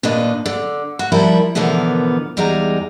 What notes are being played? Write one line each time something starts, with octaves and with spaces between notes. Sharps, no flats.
D#2 A#2 D4 B4 D#5
D3
F#4
F3 G3 E4 A#4
B2 D3 E3 F3 B3 A#4
E2 G3 G#3 D#4 A#5